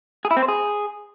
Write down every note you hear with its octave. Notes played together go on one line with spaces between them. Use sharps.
G#4
E4
C4
C5
G#4